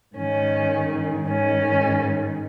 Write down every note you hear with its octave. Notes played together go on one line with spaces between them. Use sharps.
G#2 D#3 C#4
G#2 D#3 C#4